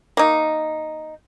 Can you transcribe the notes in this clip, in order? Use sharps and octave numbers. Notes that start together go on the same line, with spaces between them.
A#3 D#4